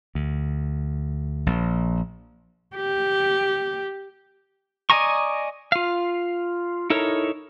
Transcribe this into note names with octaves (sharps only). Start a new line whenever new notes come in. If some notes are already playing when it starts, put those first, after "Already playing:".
D2
A#1
G4
D5 D#5 G#5 A#5 C#6
F4 F5
D#4 E4 A4 A#4 C#5